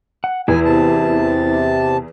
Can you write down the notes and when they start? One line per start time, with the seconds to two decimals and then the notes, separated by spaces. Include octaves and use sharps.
0.24 F#5
0.48 E2 E4 G#5
0.65 C3 A5